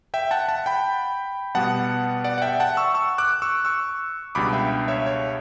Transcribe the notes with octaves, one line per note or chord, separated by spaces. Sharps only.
E5 G5
F#5 A5
F#5 A5
G5 B5
B2 G3 B3 F#5 A5
D5 F#5
F#5
E5 G5
F#5 A5
C#6 E6
C#6 E6
D6 F#6
C#6 E6
C#6 E6
C#2 B2 G3 D4 B5 D6
E5 G5
C#5 E5
C#5